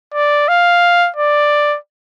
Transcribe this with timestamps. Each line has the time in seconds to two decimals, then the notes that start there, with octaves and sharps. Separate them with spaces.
0.14 D5
0.48 F5
1.16 D5